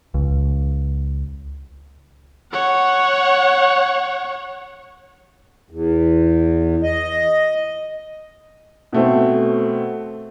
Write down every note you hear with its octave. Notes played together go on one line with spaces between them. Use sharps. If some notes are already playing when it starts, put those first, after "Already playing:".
C#2
C#5 F#5
E2
D#5
B2 A3 C4